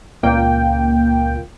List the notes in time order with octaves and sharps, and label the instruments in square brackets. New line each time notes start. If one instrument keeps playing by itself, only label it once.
[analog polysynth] C#2 A#2 A#3 G5